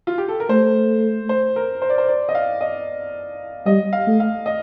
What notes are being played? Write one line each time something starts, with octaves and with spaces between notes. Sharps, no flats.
F4
G4
A4
A#4
A3 C5
C5
A#4
C5
D5
C5
D5
D#5
F5
D#5
G3 D#5
F5
A3
F5
D#5